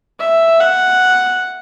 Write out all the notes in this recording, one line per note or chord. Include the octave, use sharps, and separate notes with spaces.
E5
F#5